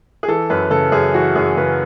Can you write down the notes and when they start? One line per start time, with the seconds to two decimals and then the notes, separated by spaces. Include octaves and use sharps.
0.23 G#4
0.28 E3 A4
0.50 F#2 B4
0.70 C#3 A4
0.92 F#2 G#4
1.14 E3 F#4
1.35 F#2 G#4
1.57 C#3 B4